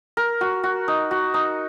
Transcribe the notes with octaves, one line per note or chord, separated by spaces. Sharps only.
A#4
F#4
F#4
D#4
F#4
D#4